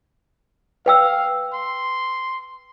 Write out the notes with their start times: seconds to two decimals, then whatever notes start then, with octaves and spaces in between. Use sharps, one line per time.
0.86 B4 F5 G5 E6
1.53 C6